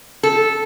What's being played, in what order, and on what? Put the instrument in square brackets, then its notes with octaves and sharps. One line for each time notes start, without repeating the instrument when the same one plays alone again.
[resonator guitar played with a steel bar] A4